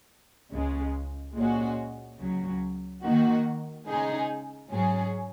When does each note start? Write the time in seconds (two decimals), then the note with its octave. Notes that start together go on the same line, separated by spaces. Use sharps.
0.52 C#2 C#3 G#3
1.36 A#2 G#3 C#4 F#4
2.19 C#2 C#3 F#3
3.03 D#3 A#3 F#4
3.87 C#3 G#3 D#4 G#4
4.70 G#2 F#3 C#4 G#4